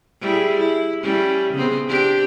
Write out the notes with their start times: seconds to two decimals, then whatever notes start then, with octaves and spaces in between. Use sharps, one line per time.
0.21 G3 E4 G#4
0.58 E4
1.03 G3 C#4 E4
1.54 C#3 B3 C4
1.88 C4 D4 G4